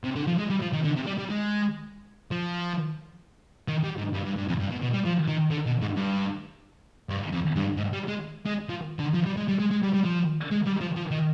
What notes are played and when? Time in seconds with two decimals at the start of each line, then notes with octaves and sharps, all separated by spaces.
0.04 C3
0.16 D3
0.27 F3
0.39 G#3
0.50 G3
0.62 F3
0.73 D#3
0.84 D3
0.95 C3
1.07 G3
1.18 G3
1.30 G#3
2.31 F3
3.68 D#3
3.84 G3
3.98 G#2
4.14 G2
4.25 G2
4.37 G2
4.49 F2
4.60 G2
4.71 B2
4.82 B2
4.93 G3
5.05 F3
5.28 D#3
5.51 D3
5.66 B2
5.81 G#2
5.96 G2
7.09 G2
7.32 F2
7.56 G2
7.77 G#2
7.93 G3
8.08 G#3
8.46 G#3
8.69 F3
8.99 D3
9.14 F3
9.26 G3
9.37 G#3
9.49 G3
9.60 G#3
9.71 G#3
9.83 G3
9.94 G3
10.05 F3
10.51 G#3
10.66 G3
10.81 F3
10.96 F3
11.11 D#3